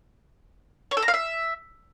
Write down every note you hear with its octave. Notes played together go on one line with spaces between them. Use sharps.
C#5
A4
A#5
F5
E5